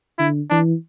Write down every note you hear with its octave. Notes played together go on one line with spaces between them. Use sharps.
D3 E4
E3 D4